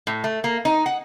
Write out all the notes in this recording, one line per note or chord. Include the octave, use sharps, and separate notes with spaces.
A2
A3
A#3
D#4
F#5